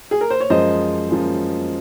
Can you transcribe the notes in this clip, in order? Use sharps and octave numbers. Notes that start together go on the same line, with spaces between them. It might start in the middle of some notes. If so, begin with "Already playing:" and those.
G#4
A#4
C5
C#5
F#2 F3 G#3 C5 D#5
F#2 F3 G#3